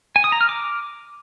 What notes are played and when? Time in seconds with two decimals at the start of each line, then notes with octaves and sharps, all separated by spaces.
0.16 G#5
0.24 D#6
0.32 A#5
0.41 F6
0.49 D6